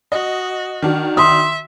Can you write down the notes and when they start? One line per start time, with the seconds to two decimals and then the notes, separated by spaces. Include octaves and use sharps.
0.12 F#4 D#5
0.82 D#3 D4 F#4
1.17 E5 C6 D#6